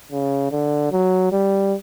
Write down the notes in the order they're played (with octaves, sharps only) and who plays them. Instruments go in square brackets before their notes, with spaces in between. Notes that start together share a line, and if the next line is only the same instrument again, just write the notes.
[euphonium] C#3
D3
F#3
G3